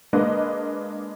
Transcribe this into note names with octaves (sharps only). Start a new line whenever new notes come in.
G#3 A#3 D4 B4 D#5